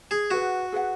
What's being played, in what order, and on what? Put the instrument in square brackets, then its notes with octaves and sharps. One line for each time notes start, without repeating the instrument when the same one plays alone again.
[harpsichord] G#4
[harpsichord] F#4 [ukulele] G#4 B4 F#5
[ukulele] G#4 B4 F#5